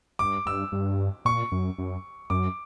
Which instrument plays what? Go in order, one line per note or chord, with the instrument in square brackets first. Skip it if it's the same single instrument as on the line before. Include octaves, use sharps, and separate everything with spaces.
[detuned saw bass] G2 [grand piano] D6
[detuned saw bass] G2 [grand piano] E6
[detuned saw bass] G2
[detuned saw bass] A#2 [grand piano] C#6
[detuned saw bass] F#2
F#2
[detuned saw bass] F#2 [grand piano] D6